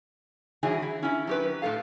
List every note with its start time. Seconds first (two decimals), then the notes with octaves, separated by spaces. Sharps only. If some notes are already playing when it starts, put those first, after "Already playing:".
0.63 G2 E3 F#3 E4 G#4 G#5
0.82 E4
1.03 C#4 E4
1.27 F#3 G4 B4
1.62 A2 C#4 A4 F5